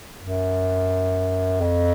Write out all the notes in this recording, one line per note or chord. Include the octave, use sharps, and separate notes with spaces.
F#2
F2